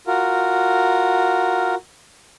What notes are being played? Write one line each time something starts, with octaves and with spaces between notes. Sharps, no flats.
F4 F#4 A#4